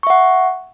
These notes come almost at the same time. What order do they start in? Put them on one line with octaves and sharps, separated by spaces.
C#6 E5 F#5